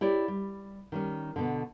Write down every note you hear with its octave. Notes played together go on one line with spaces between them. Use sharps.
E4 G4 C#5 D5
G3
D#3 G3 C#4
B2 D3